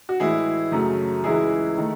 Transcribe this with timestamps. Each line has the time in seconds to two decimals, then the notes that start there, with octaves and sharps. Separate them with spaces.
0.09 F#4
0.20 A2 E3 G#3 E4 G#4
0.72 F#2 C#3 F#3 A3
1.24 C#2 C#3 E3 G#3 E4 G#4
1.78 D#3 A3